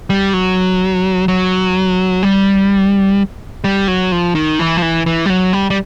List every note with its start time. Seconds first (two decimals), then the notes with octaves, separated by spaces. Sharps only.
0.10 G3
0.33 F#3
1.28 F#3
2.23 G3
3.64 G3
3.88 F#3
4.12 F3
4.35 D#3
4.59 E3
4.77 F3
4.82 E3
5.06 E3
5.26 G3
5.30 F#3
5.53 G3
5.70 G3